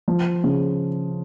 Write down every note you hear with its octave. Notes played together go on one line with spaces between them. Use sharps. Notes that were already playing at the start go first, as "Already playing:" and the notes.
F3
C#3